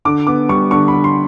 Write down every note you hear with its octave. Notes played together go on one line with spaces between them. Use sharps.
D3 D6
B3 D6
G3 C#6
D3 C#6
B5
D3
C6